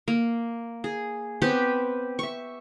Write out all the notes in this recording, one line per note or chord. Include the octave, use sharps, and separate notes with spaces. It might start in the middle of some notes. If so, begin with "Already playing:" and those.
A#3
G#4
B3 C4 G4 B4
E5 C#6